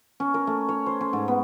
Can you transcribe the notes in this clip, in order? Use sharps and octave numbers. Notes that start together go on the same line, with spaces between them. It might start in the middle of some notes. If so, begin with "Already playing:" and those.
C#4
A#4
A3
C#5
C5
C#4
G#2
B3